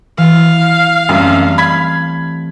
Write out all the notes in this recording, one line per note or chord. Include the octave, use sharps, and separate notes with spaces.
E3 F5
F#2 G3 A3 C4
B5 G#6 B6